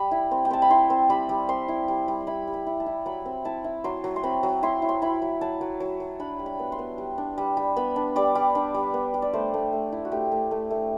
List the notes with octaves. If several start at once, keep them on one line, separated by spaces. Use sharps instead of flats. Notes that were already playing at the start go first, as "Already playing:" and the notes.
Already playing: G3 B5
E4
C4
G5
C4 A5
B5
E4 C6
C4
G3 B5
G3
C4 C6
E4
G3
G3
C6
E4 B5
G3
B5
E4
A5
E4
F#3 B5
C4
E4 A5
E4
F#3 C6
F#3
C6
C4 B5
F#3
E4 C6
E4
C6
E4 B5
F#3
F#3 A5
F#3
F#3
F#3
D4 B5
G3
B5
B3
C6
B3
G3
D4
G3
G3
B3 B5
D4
G3 D5
G3
D4
G3
B3
G3
D5
A3 C5
A3
A3
E4
F#4
A3 G4
A3
A3
A3